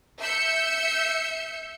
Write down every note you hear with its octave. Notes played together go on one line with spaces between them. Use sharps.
E5 E6 G6 C#7